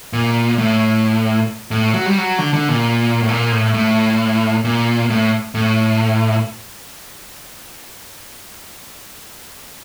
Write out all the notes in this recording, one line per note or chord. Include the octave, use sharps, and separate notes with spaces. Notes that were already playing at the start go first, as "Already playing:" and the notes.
A#2
A2
A2
F#3
G3
F#3
D3
D3
A#2
A2
A#2
A2
A2
A#2
A2
A2